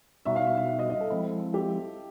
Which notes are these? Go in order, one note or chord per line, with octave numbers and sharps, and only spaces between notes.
B2 G3 B3 D#4 F#4 E5
F5
E5
E5
D#5
D#5
A4
F3 G#3 C4 E4
G4